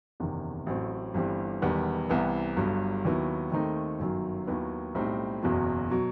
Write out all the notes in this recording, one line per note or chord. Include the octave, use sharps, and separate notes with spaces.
F#1 E2 C3 D#3
A1 A2 F#3 C4
G1 G2 E3 G3 C4
E1 E2 D#3 G3 B3
C2 C3 E3 B3
G1 G2 F#3
D#2 D#3 F#3 B3 E4
D#2 D#3 A3 C4 D#4
G1 F#2 D#3 F#3
D#2 D#3 F#3 B3 E4
B1 A2 G3 C4 D#4
F#1 E2 B2 F#3
B2 F#3